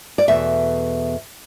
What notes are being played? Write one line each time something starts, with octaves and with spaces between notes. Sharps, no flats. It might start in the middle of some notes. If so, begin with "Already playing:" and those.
D5
E2 B2 A3 E5